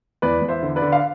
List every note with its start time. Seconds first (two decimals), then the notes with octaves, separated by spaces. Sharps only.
0.22 E2 B4 D5
0.42 E2
0.49 C5 E5
0.63 D3
0.76 B4 D5
0.82 D3
0.92 F5